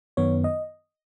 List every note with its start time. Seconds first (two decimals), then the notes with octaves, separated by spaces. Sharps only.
0.17 F#2 D#3 B3 C#5
0.44 D#5